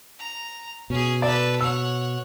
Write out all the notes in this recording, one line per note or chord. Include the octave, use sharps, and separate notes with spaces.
A#5
B2 C#4 G#4
A4 B4 D5
C#5 F#5 E6